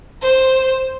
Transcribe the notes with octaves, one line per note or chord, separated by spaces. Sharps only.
C5